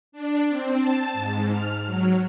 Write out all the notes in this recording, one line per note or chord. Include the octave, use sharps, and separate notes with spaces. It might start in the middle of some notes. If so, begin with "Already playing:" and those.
D4
C4
A5
G#2
F6
F#3